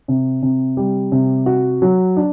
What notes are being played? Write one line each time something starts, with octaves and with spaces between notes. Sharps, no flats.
C3
C3
G3
C3
F#4
F#3
D4